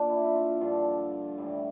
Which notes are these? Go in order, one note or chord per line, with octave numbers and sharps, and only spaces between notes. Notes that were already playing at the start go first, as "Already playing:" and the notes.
Already playing: A#2 D4
E4
E4
F4
G2 D3 F3
A2 E3 G3